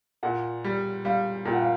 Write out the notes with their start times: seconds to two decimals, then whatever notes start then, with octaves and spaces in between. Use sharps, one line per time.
0.23 A#2 F#5
0.64 G3
1.05 G3 F5
1.45 A#2 G5
1.53 F#5
1.62 F5